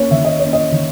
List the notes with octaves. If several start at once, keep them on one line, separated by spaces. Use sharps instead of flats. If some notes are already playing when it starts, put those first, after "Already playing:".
Already playing: A#3 C#4 C#5
D#3 E5
D#5
A#3 C#4 C#5
D#5
D#3